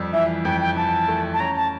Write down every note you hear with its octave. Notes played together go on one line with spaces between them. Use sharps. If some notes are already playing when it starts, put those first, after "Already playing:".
Already playing: F2 G3
E3 E5
F2 G5
G5
E3 A5
A3
A5
C#4 A#5
A5